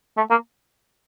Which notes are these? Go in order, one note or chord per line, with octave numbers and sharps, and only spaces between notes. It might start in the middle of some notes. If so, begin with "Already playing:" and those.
A3
A#3